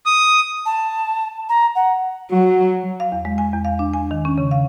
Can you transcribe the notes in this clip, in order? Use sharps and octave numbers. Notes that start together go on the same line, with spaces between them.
D#6
A5
A#5
F#5
F#3 F#4
F5
E2
G#3
G#5
E2
F5
D4
G#5
D#3
C#4
C#3
F5